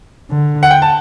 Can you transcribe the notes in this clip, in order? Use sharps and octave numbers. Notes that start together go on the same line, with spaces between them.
D3
F#5
G5
A5